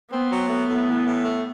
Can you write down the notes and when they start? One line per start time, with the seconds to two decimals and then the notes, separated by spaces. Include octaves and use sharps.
0.11 B3 C4
0.30 F#3
0.49 A3 B3
0.69 A2
0.87 E3
1.06 A2
1.25 A3